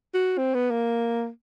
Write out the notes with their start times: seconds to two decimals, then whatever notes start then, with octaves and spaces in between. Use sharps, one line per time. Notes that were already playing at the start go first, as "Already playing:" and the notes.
0.14 F#4
0.38 C4
0.54 B3
0.71 A#3